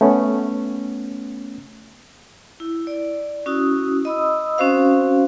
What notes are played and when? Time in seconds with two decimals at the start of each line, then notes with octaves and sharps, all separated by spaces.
0.01 A3 B3 C#4
2.60 E4
2.87 D5
3.46 C#4 E4 F#4 D#6
4.05 D#5 B5 D#6 E6
4.58 C4 C#4 F#4 C5 F5